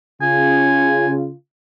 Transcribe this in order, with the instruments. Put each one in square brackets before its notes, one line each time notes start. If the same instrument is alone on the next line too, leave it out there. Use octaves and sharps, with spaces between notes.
[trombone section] C#3 F4 [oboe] G#5